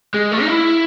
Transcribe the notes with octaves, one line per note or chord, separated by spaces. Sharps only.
G#3
A3
D#4
E4